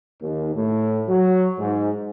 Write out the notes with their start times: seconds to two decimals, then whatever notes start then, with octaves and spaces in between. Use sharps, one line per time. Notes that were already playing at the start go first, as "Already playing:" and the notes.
0.22 D#2
0.55 A2
1.08 F#3
1.58 G#2